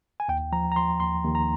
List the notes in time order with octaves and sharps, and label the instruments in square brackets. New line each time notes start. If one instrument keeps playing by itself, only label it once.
[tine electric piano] G#5
D#2 G5
F3 A#5
A#5
F3 C6
D#2 C6
D#2
A#5